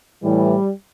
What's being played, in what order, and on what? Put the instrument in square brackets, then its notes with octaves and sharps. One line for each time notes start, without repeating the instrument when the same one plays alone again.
[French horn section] A2 E3 G3